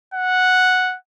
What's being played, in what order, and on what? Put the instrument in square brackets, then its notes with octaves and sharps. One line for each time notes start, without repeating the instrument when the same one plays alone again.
[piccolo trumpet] F#5